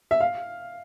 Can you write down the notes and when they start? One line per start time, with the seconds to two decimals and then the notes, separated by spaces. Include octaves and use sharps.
0.11 E5
0.20 F5